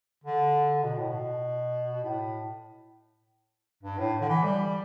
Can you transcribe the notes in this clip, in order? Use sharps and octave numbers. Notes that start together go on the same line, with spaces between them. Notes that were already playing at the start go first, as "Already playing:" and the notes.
D3
B2
A2
B2
A2
G2
A2
D3
E3
G3